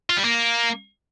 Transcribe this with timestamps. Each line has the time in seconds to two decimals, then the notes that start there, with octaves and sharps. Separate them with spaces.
0.10 F4
0.17 G3
0.24 A#3